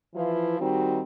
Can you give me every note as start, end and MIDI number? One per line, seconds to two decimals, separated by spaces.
0.15 0.58 52
0.15 0.58 53
0.15 0.58 64
0.15 0.58 65
0.15 0.58 71
0.60 1.01 51
0.60 1.01 55
0.60 1.01 60
0.60 1.01 63
0.60 1.01 66